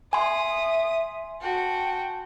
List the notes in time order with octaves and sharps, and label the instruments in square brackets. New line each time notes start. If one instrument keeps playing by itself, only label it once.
[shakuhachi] E5 [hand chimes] G#5 C6 [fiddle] D#6
[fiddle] F#4 G5 [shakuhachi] A5